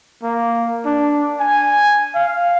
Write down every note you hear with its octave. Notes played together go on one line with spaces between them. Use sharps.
A#3
D4
G#5
F5